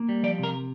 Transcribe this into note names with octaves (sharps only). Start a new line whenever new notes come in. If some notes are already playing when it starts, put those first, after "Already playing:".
Already playing: A#3
G3
F3 D5
C3 A#4